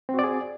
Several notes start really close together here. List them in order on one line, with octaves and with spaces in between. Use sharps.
C4 F#4 D5 G#4